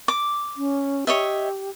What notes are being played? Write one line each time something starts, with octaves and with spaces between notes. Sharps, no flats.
D6
C#4
G4 C#5 D#5 E5